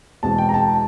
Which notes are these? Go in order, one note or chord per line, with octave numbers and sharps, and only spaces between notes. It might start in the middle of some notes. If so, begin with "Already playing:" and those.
E2 B2 G#3 C4 A5
G5
A#5
A5